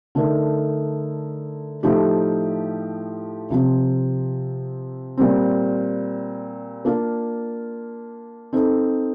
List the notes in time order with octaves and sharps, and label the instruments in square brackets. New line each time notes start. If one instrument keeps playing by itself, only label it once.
[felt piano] D3 A3 D#4 A#4
A2 F3 A3 D#4 G4
C3 F3 C4
A#2 G3 C4
A#3 D4 F4
C4 D#4 A4